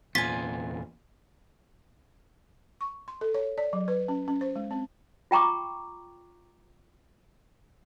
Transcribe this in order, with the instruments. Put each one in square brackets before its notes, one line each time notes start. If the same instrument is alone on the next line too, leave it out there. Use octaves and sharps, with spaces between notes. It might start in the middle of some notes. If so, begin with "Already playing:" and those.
[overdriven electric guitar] E2 A#2 [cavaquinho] F4 G#5 [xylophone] B6
[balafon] C#6
C6
A4
C#5
D5
F#3
B4
C#4
C#4
C5
G#3
C4
[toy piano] F4 G5 A#5 C#6 D6